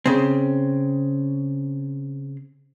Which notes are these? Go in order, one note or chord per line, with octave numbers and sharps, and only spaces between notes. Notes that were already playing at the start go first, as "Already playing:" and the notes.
C#3 C4